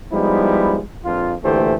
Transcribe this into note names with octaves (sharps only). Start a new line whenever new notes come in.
F3 G3 G#3 B3 D#4 E4
A#1 F2 F3 F4
D2 A#2 E3 A3 G4 C5